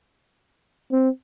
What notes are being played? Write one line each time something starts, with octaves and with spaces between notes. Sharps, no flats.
C4